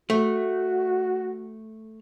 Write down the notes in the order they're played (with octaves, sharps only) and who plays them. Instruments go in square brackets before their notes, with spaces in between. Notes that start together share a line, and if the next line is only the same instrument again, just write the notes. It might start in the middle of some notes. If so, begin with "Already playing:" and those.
[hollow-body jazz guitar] A3 [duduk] F#4